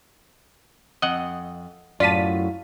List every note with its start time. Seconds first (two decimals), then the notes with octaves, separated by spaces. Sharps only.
1.02 F2 D#5 F#5
2.00 F#2 A2 F4 D5 F5 A5 B6 D#7